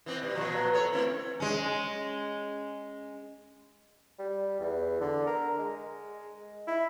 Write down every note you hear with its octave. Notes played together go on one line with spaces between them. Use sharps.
E3 B3 C4
B2 G3
A#2 F3 F#3
B3 A4 C#5
A3 C4 E4
G#3 C#4
G3
E2
D3
A#4
G#3
E4